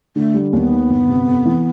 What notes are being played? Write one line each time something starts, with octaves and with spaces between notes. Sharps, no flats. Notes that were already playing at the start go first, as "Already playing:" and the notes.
D3 A3
G3
D#2 B3 D4
D#3
G1
C3
F2
E3